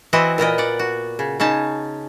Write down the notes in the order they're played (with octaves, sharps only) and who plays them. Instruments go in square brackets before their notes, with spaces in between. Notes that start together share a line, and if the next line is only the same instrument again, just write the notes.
[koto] E3 C4 E4 F#4 D#5
A#2 B3 A#4 D#5
D5 F#5
F#4
C#3
C#3 C#4 D#4 A5